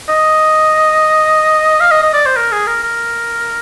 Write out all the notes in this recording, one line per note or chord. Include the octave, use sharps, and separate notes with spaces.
D#5
F5
D#5
D#5
D5
C5
A#4
G#4
A#4
A#4